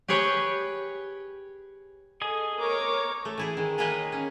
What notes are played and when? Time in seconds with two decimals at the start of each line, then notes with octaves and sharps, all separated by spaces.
0.08 G4 G#4 B4 C#5 G5
2.22 G#4 A4 D#5 G#5
2.59 A#4 C#5 D6
3.25 A3
3.38 E3 E4 G#4
3.57 D#3 G#3
3.78 G#3 A#3 G#4 B4 C#5 D#5
4.12 C#4